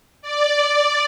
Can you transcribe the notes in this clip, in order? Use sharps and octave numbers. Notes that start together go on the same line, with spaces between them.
D5